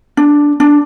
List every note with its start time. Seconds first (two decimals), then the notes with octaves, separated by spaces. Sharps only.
0.17 D4
0.60 D4